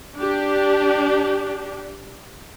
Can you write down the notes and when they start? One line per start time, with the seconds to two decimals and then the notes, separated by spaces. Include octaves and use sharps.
0.17 D4 G4